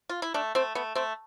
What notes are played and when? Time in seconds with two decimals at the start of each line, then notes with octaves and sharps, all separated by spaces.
0.09 F4
0.22 E4
0.34 A3 D4
0.55 A3 C4
0.75 A3 B3
0.95 A3 C4